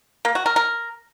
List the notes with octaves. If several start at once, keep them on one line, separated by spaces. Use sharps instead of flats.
A#3
F#4
A#4
A#4